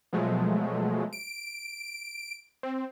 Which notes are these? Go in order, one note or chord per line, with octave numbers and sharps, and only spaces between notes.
B2 F3 F#3 G#3 A3
D7
C4